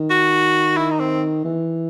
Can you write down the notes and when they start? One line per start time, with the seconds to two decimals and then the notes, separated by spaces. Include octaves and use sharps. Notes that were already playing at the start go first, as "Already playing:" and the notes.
Already playing: D#3
0.11 F#4
0.77 E4
0.91 D#4
0.99 C4
1.44 E3